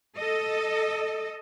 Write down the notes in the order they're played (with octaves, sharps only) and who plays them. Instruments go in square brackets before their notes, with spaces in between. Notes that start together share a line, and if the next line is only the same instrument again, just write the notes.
[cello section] A4 D#5